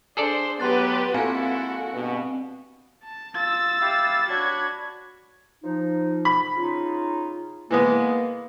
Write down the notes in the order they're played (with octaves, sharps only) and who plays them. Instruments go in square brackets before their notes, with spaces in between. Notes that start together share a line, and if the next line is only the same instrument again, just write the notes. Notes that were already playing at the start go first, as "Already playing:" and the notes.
[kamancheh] D4 C5 [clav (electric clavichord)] G#4 A4 D5
[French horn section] A2 F#3 B3 [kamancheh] G4 B4 [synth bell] C6 F#6 A6
[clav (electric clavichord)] A#2 [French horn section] G#3 E4 A4 [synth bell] C4 F5 G#5 [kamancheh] F#4
[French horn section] G2 B2
[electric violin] A5
[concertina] F4 [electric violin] E6 A6
[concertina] E4 G4 F5
[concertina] D4 C#5 B5 [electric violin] F#4 G#6
[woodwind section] F3 D#4
[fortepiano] B5
[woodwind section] C#3 D#4 F4
[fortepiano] E3 G#3 B3 [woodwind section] A#3